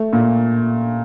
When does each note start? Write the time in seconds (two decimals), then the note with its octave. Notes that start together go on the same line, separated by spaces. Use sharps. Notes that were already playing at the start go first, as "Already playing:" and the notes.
Already playing: A3
0.13 A#2